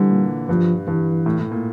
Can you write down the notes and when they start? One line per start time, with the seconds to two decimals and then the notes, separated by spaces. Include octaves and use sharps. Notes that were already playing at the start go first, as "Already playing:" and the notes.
Already playing: D3 E3 G3
0.10 A#2
0.48 G2 F3
0.87 G2 E3
1.26 A2
1.39 A2
1.52 A#2